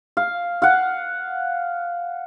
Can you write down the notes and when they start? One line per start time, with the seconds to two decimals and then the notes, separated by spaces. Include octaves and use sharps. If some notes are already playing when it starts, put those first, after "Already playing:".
0.17 F5
0.62 F5 F#5